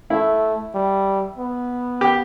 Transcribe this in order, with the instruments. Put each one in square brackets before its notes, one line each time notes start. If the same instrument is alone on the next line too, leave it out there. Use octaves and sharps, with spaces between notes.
[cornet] A3 [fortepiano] E4
[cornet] G3
B3
[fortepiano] G4